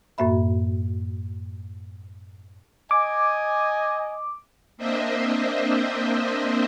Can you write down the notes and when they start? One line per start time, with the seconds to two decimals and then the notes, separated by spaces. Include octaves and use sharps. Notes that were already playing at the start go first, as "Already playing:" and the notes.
0.18 F#2 A2 A#3 F#4 E5 B5
2.91 D#5 G#5 D6
4.77 A#3 C4 D4 C5 D#5 E5